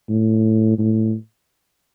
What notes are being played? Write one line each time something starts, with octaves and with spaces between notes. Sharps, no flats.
A2
A2